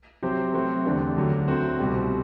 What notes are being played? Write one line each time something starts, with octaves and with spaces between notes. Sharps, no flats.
C3 F#3 C4 G4 C5
F#3 A3 C4 F#4
E2 D3 A3 D4 G4
D2 D3 F#3
D3 A3 C4 F#4
C2 B2 G3 C4